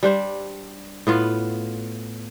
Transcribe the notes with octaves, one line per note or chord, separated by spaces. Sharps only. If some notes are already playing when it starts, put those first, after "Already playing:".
G3 D4 C5
A2 B3 F4